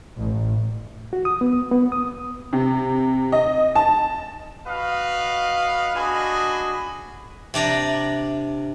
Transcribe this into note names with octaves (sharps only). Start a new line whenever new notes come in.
A1
F#4
D#6
B3
B3
D#6
C3
D#5
A5
F#4 B4 D#5 F5
D4 F#4 G#4 D#5 G#5 B5
C3 D4 D5 A#5